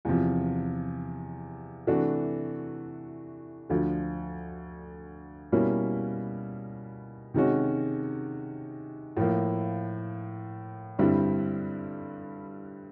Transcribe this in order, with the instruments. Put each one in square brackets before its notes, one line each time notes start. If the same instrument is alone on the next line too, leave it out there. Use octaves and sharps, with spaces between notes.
[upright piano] E2 C3 F3
C3 E3 A3 D4 F#4
D2 D3 F3
B2 G3 A#3 C#4 E4
C3 D#3 G#3 C#4 F#4
A2 F3 A#3
G2 D3 G3 C4 E4